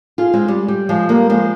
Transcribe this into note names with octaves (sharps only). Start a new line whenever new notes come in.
F4 G#4
G#3 C4
G3
G3
F3 G#3
G3 A#3
F3 G#3